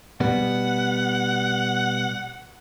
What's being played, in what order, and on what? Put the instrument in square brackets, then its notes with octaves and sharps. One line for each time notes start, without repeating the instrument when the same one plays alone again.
[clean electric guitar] B2 G3 B3 [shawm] F#5